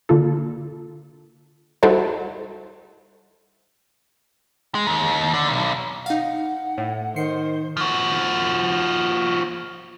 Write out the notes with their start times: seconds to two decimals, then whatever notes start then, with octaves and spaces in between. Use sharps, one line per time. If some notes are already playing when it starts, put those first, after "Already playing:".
0.09 D3 A#3 F4 A4
1.83 G3 D#4 E4 F#4 A4 C5
4.75 G#3
4.87 D#2
5.34 D3
5.48 B1
6.06 D#4 F5 F#5
6.77 A2
7.16 D#3 C5 C7 C#7
7.77 F3 F#4